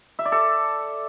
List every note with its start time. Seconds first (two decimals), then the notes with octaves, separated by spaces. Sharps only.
0.19 E5
0.25 D5
0.32 A4